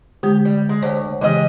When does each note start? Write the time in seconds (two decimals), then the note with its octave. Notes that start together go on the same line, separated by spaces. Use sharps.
0.23 D3 G#3 G4
0.45 G3
0.69 G#3
0.83 D2 C5 C#5
1.21 C#3 E3 G#3 G4 D#5